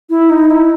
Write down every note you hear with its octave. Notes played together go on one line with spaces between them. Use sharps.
E4
D#4
E4